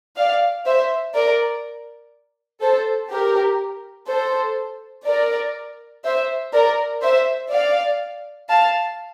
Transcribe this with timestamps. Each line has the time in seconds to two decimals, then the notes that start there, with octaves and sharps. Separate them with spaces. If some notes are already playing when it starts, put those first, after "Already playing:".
0.17 D5 F5
0.66 C5 E5
1.15 A#4 D5
2.62 A4 C5
3.10 G4 A#4
4.08 A4 C5
5.06 A#4 D5
6.05 C5 E5
6.53 A#4 D5
7.02 C5 E5
7.51 D5 F5
8.49 F5 A5